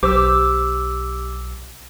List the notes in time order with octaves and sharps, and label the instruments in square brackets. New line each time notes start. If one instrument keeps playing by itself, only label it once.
[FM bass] B1 [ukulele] G4 C5 [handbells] D6 E6